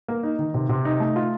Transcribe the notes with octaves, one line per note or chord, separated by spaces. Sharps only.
A#3
D#4
D#3
C3
C3
D#4
A3
F4